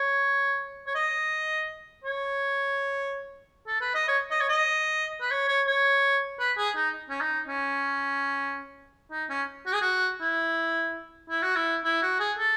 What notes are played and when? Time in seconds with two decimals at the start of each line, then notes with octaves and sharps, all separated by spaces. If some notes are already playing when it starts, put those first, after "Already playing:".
Already playing: C#5
0.87 C#5
0.95 D#5
2.04 C#5
3.67 A4
3.81 B4
3.95 D#5
4.08 C#5
4.31 D#5
4.40 C#5
4.49 D#5
5.21 B4
5.31 C#5
5.48 C#5
5.67 C#5
6.39 B4
6.58 G#4
6.76 D#4
7.10 C#4
7.21 D#4
7.48 C#4
9.12 D#4
9.30 C#4
9.66 F#4
9.74 G#4
9.81 F#4
10.21 E4
11.30 E4
11.42 F#4
11.56 E4
11.84 E4
12.02 F#4
12.20 G#4
12.38 A4